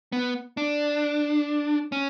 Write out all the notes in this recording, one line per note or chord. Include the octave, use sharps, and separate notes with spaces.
B3
D4
C#4